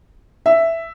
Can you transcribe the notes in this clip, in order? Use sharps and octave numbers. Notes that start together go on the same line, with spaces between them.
E5